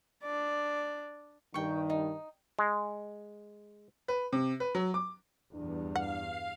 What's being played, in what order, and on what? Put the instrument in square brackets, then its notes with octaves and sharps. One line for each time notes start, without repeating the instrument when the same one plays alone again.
[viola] D4 D5
[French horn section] G2 D#3 [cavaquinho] G5 C#6
[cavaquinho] D#4
[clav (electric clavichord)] G#3
[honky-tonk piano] B4
C3
B4
F#3
D6
[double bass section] E2 G2 [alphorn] D4
[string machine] F5 [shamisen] F#5